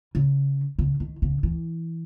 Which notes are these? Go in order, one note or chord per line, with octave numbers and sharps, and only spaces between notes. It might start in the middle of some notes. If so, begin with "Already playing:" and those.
C#3
C#3
D#3
C#3
E3